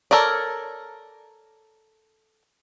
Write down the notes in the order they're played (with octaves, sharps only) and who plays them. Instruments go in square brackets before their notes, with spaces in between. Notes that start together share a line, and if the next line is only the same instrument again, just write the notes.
[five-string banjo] A4 A#4 C#5 D5